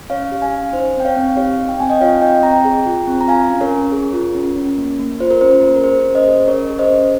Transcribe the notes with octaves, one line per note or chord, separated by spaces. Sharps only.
C#4 C#5 F5
G4
F5 G#5
C#4
D#4 C5
C4 G5
C#5 F5
C4
G4 C#5 F5
D#4
G5
C4 G#5
D#5 G5
F4 C#5 F5
C4 D#5 G5
C4 G5 A#5
G#4
F4
C4
A#5
F4 F5 G#5
C#4
A#4 C#5
C#4
G#4
F4
C#4
C#4
A#3
A#3
F4 C5
A#4
C#4 C5
A#4
A#3
A#4
G#4 C5
C#4
C5 D#5
G#4
C#4 A#4 C#5
G#4
C5 D#5
C#4